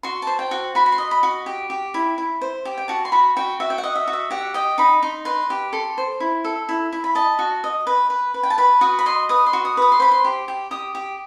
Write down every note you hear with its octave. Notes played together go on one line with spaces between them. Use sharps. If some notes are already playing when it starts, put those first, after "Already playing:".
F#4 C6
C5 A5
G5
F#4
F#4 B5
B5
C6
D#5
B5
F#4
G4
G4
E4
E4
C5
G4
G5
F#4 A5
C6
F#4 B5
F#4 G5
F#4 E5
G5
F#5
D#5
E5
F#4
E5
G4 F#5
D#5 G5
D#4 B5
D#4 C6
B4 C6
G4
A4 C6
C5
E4
A4
E4
E4
B5
D#5 A5
F#4
D#5
B4
B4
B4
G5
A5
B4 B5
F#4 D#6
B5
D#5 C6
B4 D#6
C6
F#4
D#6
B4 D#6
C6
C5 B5
C6
G4
G4
G4 D#6
G4